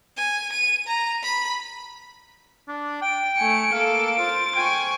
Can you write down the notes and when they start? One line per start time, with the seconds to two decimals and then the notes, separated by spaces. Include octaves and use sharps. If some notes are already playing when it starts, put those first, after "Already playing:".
0.17 G#5
0.53 D#7
0.87 A#5
1.23 B5
2.68 D4
3.02 G5 D7
3.37 A3 G#5 C#7
3.72 A#3 A4 F5
4.19 F4 C5 A6
4.56 G5 G#5 C#6